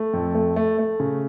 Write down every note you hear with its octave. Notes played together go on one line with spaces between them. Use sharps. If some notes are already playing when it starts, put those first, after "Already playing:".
Already playing: A3
F2
A3
A3
A3
C#3